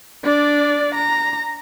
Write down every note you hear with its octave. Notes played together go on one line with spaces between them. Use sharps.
D4 D5
A#5